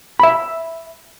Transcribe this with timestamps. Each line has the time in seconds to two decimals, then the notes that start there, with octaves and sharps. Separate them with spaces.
0.20 E5 B5